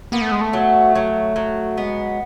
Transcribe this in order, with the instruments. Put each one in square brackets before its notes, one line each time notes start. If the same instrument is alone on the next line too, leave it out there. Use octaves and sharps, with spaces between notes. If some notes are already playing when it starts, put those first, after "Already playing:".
[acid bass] A#3 [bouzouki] B3
[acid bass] A3
G#3
A3
[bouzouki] F#3
F#3
F#3
[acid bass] G#3 [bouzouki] B3